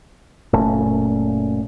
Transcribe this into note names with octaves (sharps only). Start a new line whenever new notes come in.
F#1 A#2 A3 C#4